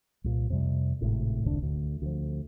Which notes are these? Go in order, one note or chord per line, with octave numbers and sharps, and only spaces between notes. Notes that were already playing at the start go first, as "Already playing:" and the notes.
C2 A#2
F2 C3 G3
G#1 A2 C3
E1 C2 D3 D4
D2
D2 F3